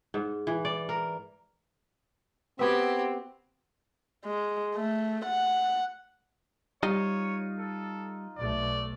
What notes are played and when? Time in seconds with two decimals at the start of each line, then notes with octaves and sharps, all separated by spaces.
0.14 G#2
0.47 E3
0.65 D5
0.89 A#4
2.59 B3 C4 F#4 G4 B4 E5 B5 G#6
4.24 G#3
4.75 A3
5.25 F#5
6.83 G3 D#4 F4 C#5 D#5
7.59 A4
8.38 B1 A3 D5